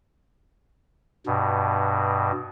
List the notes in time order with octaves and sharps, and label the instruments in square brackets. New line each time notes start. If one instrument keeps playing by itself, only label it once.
[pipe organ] G2 B2